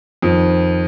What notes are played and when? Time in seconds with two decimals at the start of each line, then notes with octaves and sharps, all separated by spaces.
0.22 F2 D#3